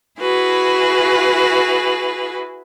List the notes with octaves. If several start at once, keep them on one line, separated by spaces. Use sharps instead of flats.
E4 F#4 G#4 B4